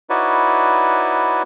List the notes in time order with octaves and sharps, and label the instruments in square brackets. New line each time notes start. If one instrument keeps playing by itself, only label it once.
[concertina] D#4 E4 F#4 B4 C#5 D5